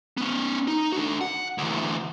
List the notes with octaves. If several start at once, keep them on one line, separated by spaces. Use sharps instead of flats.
B3 C#4
D#4
D4 F#4
F#5
D2 E3